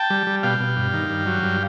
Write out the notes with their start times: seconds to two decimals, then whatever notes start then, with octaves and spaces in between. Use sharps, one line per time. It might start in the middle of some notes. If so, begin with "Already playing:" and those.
Already playing: G5 A5
0.10 G3
0.27 G3
0.43 B2 F5 G5
0.60 B2
0.77 G2
0.93 D#3
1.10 G2
1.26 F#3
1.43 G2